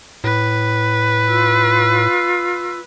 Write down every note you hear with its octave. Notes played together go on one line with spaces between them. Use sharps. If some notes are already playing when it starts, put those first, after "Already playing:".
A2 B4
F4 E6